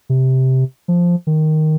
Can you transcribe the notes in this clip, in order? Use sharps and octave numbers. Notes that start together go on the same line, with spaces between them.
C3
F3
D#3